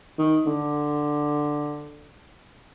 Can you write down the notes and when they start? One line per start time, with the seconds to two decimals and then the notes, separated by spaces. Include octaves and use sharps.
0.18 D#3
0.46 D3